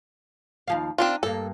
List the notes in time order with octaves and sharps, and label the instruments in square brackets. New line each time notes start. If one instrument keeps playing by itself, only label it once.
[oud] D#2 F3 F5
[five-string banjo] C4 D4 F4 [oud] D#4
[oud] G2 A#3 [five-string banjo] A4